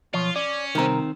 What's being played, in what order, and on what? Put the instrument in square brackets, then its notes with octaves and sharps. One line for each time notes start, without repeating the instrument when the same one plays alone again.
[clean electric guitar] B1 F3 C#5 [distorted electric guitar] F4
[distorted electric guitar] C#4 [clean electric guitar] D5
[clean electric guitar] C2 A#4 [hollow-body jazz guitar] D#3 C4